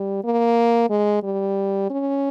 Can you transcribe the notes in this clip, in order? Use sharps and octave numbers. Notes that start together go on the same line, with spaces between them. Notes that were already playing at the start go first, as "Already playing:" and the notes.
Already playing: G3
A#3
G#3
G3
C#4